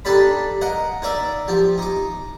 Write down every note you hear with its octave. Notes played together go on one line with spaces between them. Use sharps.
D4 D#4 G4 A4 D5 B5
A#4 D#5 F#5
D#4 A#4 D5 E5
F3 G4
D#4 D6